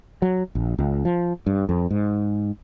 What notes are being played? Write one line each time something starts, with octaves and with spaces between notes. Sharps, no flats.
F#3
A#1
C#2
F3
G2
F2
G#2